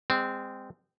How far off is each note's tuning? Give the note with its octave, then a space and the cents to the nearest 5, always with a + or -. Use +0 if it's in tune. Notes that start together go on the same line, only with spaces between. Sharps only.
G#3 -35 C4 -15